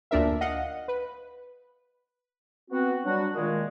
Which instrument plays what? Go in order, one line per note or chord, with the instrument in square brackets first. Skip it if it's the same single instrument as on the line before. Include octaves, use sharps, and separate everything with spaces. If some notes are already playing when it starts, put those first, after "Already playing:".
[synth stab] D2 A#2 D4 A#4 E5
D#5 F5 F#5
B4
[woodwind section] B3 C4 F#4
F#3 G3 D4 F#4
A#2 D#3 G#3